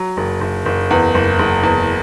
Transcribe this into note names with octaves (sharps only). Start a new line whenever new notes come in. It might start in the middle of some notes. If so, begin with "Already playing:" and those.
Already playing: F#3
F#1
F#1
F#1
E2
F#1
F#1
E2